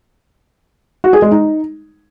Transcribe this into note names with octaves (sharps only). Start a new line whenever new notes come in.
F#4
G#4
G#3
D#4